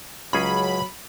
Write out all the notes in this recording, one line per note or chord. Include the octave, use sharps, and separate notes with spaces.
C#2 F#3 C#4 G#4 B5